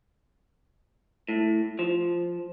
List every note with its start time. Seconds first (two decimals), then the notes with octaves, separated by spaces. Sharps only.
1.29 A2
1.79 F3